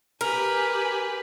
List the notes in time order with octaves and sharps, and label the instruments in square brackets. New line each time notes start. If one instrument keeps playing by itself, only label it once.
[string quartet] G4 B4 G#5 [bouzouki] A#4